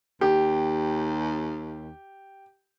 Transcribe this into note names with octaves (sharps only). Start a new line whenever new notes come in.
D#2 G4